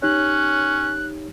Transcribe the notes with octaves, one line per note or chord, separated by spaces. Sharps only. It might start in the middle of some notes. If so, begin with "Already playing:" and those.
C#4 D#4 G4 C#5 F#6